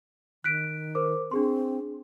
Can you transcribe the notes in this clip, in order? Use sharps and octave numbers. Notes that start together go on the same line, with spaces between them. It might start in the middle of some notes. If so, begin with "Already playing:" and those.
D#3 F#6 B6 D7
A#4 C5 D6
C4 D4 G#4 C6